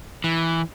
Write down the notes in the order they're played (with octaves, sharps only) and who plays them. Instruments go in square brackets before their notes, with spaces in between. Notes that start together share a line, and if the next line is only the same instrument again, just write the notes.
[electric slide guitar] E3